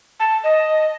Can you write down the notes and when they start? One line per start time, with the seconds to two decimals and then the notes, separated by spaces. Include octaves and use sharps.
0.19 A5
0.43 D#5